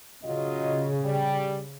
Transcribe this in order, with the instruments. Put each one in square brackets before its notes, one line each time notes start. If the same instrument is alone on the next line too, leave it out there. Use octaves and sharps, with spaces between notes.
[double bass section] C#3 [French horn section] F#3 F4 D#5
[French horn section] G3